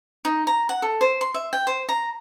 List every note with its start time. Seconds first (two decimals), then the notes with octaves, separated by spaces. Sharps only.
0.25 D#4
0.47 A#5
0.69 F#5
0.82 A4
1.01 C5
1.21 C6
1.34 E5
1.53 G5
1.67 C5
1.89 A#5